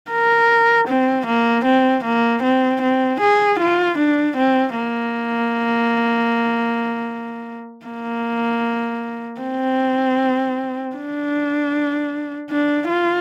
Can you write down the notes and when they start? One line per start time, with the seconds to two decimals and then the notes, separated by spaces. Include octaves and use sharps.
0.11 A#4
0.88 C4
1.26 A#3
1.65 C4
2.04 A#3
2.43 C4
2.82 C4
3.21 G#4
3.60 F4
3.98 D4
4.37 C4
4.76 A#3
7.86 A#3
9.41 C4
10.96 D4
12.50 D4
12.90 F4